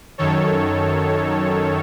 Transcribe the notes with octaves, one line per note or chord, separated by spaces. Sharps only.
F#2 D#3 A4 C#5